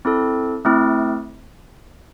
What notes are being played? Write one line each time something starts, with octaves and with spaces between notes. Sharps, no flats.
C4 E4 A4
A3 C4 E4